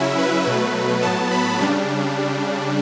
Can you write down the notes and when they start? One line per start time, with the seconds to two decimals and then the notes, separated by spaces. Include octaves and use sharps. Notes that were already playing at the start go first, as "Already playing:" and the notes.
Already playing: C#3 F#3 C#4 E4 E5
0.18 B4
0.47 B2 F#3 A3
1.02 A2 F#3 B3 A5
1.31 B5
1.59 C#3 G3 D4